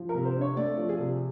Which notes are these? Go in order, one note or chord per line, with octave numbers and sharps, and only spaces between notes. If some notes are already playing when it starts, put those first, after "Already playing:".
Already playing: F3
A#4
C3
C5
D4
C#5
A3 D5
F3
G#4
C3